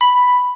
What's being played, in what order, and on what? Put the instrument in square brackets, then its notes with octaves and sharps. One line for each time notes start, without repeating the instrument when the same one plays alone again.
[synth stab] B5